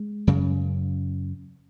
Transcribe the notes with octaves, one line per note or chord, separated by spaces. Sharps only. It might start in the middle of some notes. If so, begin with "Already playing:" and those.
Already playing: G#3
F#2 C#3